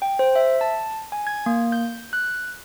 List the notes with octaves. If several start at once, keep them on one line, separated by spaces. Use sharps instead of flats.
G5
C5
E5
A5
G#5
G#6
A#3
G6
F#6